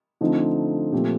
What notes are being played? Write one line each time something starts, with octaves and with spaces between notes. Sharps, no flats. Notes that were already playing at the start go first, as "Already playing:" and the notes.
D3 F3 A3 C4 D#4
A#2 F3 A3 C4 G4